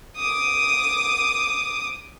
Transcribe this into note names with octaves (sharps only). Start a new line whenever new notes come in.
D6 D#6